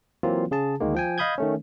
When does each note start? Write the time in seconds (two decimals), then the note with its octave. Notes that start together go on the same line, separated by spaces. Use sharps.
0.23 E3 F#3 A#3 C4 F4
0.51 C#3 G#4 A5
0.81 D2 D#3 G#3 A#3
0.94 F3 G5 G#5
1.18 D#5 F5 B5 D#6 G6 G#6
1.38 D#3 A3 C#4